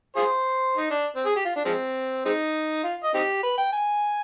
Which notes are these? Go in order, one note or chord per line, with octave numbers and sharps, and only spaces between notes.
F4 G#4 C5
D#4
D4
C4
G#4
G4
F4
D4
F3 G#3 C4
G#3 C4 D#4
F4
D#5
C4 D#4 G4
B4
G5
G#5